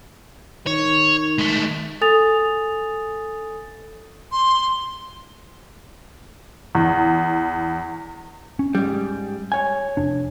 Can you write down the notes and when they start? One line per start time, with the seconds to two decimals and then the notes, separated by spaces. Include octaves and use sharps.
0.66 D#3 C#5
1.39 G#3 A3
2.01 A4 G#5 D#6 A6 F7
4.32 C6
6.75 E2
8.59 C#4
8.75 G#2 G3
9.52 C#5 G#5
9.97 F1 D4